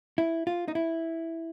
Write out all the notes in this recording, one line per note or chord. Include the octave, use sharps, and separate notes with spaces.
E4
F4
D#4
E4